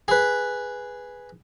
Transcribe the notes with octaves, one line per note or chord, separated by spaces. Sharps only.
G#4 B4